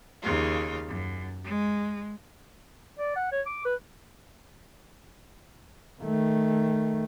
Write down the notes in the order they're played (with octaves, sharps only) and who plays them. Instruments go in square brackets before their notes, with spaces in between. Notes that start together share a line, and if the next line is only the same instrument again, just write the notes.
[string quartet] D#2 C#3 F4
F#2
G#3
[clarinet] D5
F#5
C#5
D6
B4
[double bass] D#3 A3